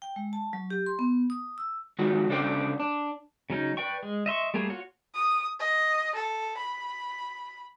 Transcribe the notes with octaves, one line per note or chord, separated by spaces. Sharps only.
G5
G#3
A5
F#3
G4
C6
B3
D#6
E6
D#3 G#3 F4 F#4 A4
C#3 D4 A4 C5 D5 G5
D4
C#3 F#3 C#4 D#4
B4 D5 G5 C#6
G#3
D#5 E5 C6 C#6
G3 A3 A#3 G#4
F4 F#4 C#5
D#6
D#5
A4
B5